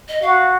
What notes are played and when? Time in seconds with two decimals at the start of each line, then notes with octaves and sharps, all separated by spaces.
0.08 D#5
0.22 F#4 F5